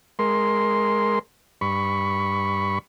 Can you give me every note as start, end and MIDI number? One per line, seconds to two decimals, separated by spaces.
0.19 1.19 56
0.19 1.19 70
0.19 1.19 84
1.61 2.79 43
1.61 2.79 83
1.61 2.79 85